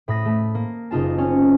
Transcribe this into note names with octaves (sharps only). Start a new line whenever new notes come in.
A2 B5 D#6 A#6
A3
A#3
F#1 D#4 F4 A5
C4 C#4 D#4